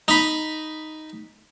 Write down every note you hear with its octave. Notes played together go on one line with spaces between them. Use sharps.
D#4 B5